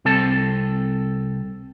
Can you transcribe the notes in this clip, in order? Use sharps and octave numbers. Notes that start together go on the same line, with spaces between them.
C2 C4 A4 A5